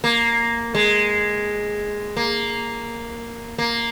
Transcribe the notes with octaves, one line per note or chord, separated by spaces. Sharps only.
A#3
G#3
A#3
A#3